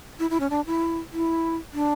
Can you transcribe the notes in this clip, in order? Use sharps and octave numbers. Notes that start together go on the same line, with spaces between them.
E4
E4
C#4
D4
E4
E4
D4